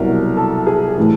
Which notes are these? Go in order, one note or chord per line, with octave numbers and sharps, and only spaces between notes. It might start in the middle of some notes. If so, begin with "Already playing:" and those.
Already playing: C2 B2 F#3 A#4
A4
G#4
A2 E3